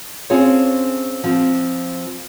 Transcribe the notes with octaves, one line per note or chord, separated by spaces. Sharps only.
C4 C#4 F4 G#4 A4 C#5
F3 C4